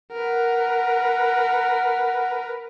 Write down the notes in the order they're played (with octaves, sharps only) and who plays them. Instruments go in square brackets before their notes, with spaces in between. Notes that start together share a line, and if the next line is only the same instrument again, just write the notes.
[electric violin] A#4 B4 [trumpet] F#5